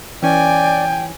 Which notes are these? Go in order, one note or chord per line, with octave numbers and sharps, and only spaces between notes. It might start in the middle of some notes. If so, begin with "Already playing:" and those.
E3 C#4 D5 G5 G#5